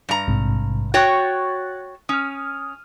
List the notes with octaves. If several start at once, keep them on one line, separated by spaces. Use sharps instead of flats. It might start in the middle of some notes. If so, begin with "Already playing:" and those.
G2 A#5
A#1 G#2 C3
F#4 C#5 G5 C#6 F#6 A6
C#4 D#6 F6